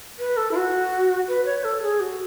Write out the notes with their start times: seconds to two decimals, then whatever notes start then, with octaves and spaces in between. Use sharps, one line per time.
0.19 B4
0.37 A4
0.51 E4
0.56 F#4
1.28 B4
1.45 C#5
1.64 A4
1.82 G#4
2.00 F#4